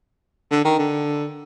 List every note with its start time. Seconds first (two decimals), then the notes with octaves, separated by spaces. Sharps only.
0.51 D3
0.65 D#3
0.79 D3